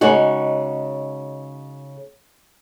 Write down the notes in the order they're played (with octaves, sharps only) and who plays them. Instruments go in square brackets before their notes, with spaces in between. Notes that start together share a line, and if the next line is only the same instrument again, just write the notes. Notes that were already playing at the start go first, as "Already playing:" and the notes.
[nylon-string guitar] C#3 G#3 D#4 F#4